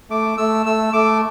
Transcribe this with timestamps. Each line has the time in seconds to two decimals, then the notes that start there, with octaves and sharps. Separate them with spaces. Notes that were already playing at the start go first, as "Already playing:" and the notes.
0.10 A3 D6
0.38 A3 E6
0.66 A3 E6
0.93 A3 D6